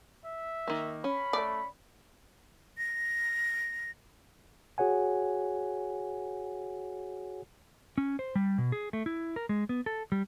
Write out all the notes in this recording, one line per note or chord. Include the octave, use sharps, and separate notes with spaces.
E5
D#3 A#3
C#4 B5
A3 D5
A#6
F#4 G#4 C#5 F#5 G#5
C#4
C5
G3
B2
G#4
A3
E4
A#4
G#3
B3
A4
G3